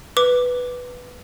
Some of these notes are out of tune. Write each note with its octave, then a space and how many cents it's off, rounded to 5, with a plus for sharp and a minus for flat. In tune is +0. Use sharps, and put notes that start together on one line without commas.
B4 +0 D6 +0